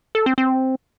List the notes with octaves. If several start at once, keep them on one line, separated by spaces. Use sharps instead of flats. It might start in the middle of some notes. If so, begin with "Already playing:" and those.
A4
C4
C4